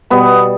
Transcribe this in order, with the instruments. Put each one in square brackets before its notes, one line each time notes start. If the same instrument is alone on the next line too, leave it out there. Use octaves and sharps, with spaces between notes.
[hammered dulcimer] B2 G3 B3